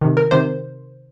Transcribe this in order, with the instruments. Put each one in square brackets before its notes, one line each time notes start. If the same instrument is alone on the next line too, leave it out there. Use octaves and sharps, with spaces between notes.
[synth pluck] C3 D#3
A#4
C3 D#3 C5